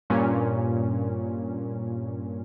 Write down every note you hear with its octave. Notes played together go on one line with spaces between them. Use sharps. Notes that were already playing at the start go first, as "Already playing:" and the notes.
G2 A#2 C#4